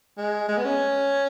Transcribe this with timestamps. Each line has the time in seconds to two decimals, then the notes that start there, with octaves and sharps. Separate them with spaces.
0.18 G#3
0.49 G#3
0.57 B3
0.65 C#4